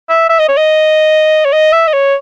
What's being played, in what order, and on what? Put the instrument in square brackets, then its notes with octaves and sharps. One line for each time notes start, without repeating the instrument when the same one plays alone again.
[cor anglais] E5
E5
D#5
C#5
D#5
C#5
D#5
E5
D#5
C#5